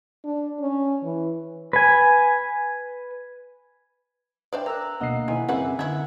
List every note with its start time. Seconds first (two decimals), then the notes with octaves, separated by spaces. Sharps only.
0.25 D4
0.60 C#4
1.04 E3
1.73 B4 G#5
4.53 D4 B4 C5 D5 E5 G5
4.66 A#4 A#5 E6 F#6
5.00 D2 B2 A#3 D#5 F#5 C7
5.28 D#3 G#3 E4 C5 G#5 B5
5.49 F#1 A#3 C4 G#4 B4 E5 F#5
5.79 D3 D#3 E4 E5 F#5 G#6